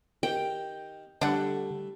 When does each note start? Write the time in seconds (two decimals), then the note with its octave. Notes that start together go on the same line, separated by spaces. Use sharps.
0.23 D#3 D#4 G4 G5
1.21 D3 G3 A3 D4 E4 F#5